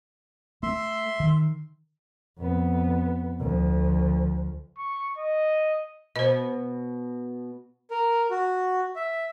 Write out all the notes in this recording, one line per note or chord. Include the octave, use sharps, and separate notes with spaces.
A3 E5 C6
D#3
F2 B3
D2 F3
C#6
D#5
B2 C5 D#5
A#4
F#4
E5